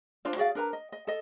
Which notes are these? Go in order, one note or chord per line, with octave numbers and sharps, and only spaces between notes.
D4 F4 C5 D5
F#4 G#4 D5 F5
D4 A#4 B4 A#5
D#5
D#5
A4 D#5